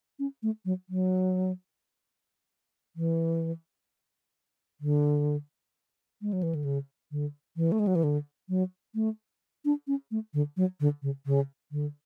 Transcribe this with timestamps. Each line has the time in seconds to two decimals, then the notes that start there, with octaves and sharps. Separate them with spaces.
0.19 C#4
0.43 A3
0.65 F#3
0.90 F#3
2.96 E3
4.81 D3
6.22 G#3
6.33 F#3
6.43 E3
6.55 D3
6.64 C#3
7.12 D3
7.57 E3
7.72 A3
7.79 G#3
7.87 F#3
7.95 E3
8.04 D3
8.49 F#3
8.95 A3
9.65 D4
9.87 C#4
10.11 A3
10.34 D3
10.57 F#3
10.80 D3
11.02 C#3
11.26 C#3
11.72 D3